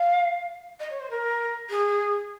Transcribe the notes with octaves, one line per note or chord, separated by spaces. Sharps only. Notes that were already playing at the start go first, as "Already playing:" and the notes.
Already playing: F5
D#5
C#5
C5
A#4
G#4